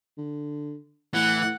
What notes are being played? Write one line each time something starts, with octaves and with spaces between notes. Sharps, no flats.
D3
A2 E3 F#5